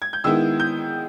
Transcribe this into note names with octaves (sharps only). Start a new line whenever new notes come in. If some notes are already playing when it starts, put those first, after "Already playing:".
G#6
G6
D#3 G#3 B3 E4 E6
G6